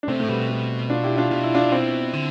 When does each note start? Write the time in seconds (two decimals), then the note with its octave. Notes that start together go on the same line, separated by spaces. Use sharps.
0.03 D4
0.08 C3 A3 C4
0.20 A2 A3
0.28 B2 G3 B3
0.49 A3
0.90 D4 F4
1.03 E4 G4
1.18 D4 F4
1.31 B2 F4
1.43 E4
1.54 D4 F4
1.72 C4 E4
2.13 D3